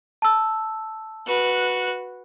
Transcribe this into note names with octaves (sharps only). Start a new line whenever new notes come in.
A5 E6
F#4 B4